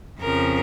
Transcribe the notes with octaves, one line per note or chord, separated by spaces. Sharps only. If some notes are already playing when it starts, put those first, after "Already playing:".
F2 C#3 F3 A#4